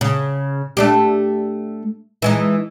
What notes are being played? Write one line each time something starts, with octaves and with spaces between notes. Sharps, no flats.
C#3
A3 D4 G4
E3 G#3 D#4